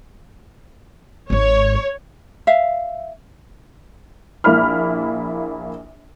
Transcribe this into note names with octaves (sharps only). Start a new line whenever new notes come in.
G#1 G#2 C#5
E5 F5
A#1 A#3 E4 B5 F6